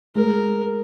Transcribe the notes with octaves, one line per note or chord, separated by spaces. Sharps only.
G#3 A#4